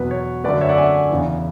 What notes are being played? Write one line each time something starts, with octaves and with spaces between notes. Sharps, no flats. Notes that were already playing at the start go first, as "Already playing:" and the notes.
Already playing: E2 B2 F#3 B3 B4
C#5
F#2 D3 A3 B4 D5
C#5 E5
D5 F#5
E5 G#5
E2 C#3 E3